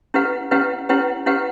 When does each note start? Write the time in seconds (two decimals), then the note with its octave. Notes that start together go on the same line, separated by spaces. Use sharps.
0.14 C#4 E4 G4 B4 F#5
0.51 C#4 E4 G4 B4 F#5
0.89 C#4 E4 G4 B4 F#5
1.26 C#4 E4 G4 B4 F#5